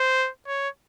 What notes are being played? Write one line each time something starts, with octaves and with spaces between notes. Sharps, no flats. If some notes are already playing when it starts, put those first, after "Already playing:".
Already playing: C5
C#5